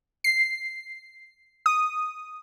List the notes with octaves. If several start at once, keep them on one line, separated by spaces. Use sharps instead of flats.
C7
D#6